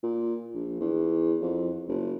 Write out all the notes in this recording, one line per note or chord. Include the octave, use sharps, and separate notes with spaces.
A#2
A#1
E2
F2
F#1